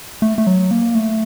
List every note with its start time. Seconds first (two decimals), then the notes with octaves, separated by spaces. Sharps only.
0.22 A3
0.38 A3
0.47 F#3
0.71 A#3
0.95 A3